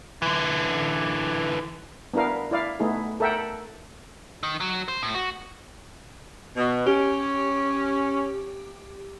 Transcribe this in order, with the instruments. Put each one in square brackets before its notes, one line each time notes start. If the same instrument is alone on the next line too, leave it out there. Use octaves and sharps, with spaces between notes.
[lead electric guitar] D3 E3
[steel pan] B3 D4 E4 A#4 F5
E4 D5 F5
A3 B3 D#4 E4 G#4
A4 A#4 E5 F#5 G5
[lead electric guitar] D#3
F#3
C5
A2
F#4
[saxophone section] B2
[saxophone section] C#4 [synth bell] G4